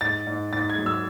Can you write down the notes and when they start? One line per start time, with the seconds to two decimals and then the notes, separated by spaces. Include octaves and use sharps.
0.01 G#2 A6
0.27 G#2
0.52 G#2 A6
0.70 G#6
0.78 F#3
0.86 E6